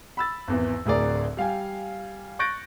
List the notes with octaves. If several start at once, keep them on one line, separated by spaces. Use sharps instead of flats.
B5 E6 A6
G#1 E2 E3
D1 D2 A2 G#4 A#4 D5
G3 F5 G5 G#5
C#6 F#6 G6 A6 A#6 D7